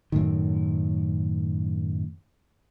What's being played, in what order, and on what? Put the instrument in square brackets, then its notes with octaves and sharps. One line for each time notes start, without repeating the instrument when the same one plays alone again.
[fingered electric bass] F#2 A2 D#3